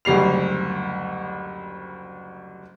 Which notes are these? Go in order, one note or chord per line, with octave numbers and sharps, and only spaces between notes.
F#1 D2 G3 C7 F7